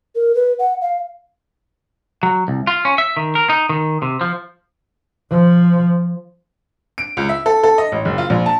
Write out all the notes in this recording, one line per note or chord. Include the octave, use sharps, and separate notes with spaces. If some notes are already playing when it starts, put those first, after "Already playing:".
A#4
B4
F#5
F5
F#3
C2
F4
C#4
E5
D#3
A#4
D#4
D#3
C3
F3
F3
D7
C#2
E5
A4
A4
D#5
A1
F#1
F4
A#1
A5